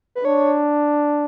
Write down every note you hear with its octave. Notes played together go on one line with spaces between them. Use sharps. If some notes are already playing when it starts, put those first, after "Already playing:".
B4
D4 C#5